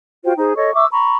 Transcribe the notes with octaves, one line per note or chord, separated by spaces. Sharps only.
F4 F#4 C5 G5
D#4 G#4 C5
A4 C#5 D#5 C#6
E5 C#6 D6 E6
A#5 B5 C#6